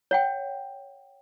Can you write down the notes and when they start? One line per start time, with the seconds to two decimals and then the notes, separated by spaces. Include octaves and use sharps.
0.11 C#5 F#5 G5